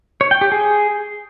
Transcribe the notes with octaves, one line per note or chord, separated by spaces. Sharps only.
C#5
G5
G4
G#4